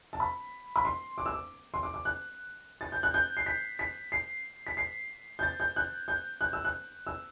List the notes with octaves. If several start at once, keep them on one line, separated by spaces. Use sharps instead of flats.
A5
B5
B5
C6
D6
E6
D6
C6
D6
D6
F#6
A6
G6
F#6
G6
C7
B6
B6
C7
B6
C7
G6
A6
G6
F#6
G6
F#6
E6
F#6
E6